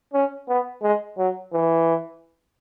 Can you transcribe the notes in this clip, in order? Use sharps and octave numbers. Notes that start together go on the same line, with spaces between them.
C#4
B3
G#3
F#3
E3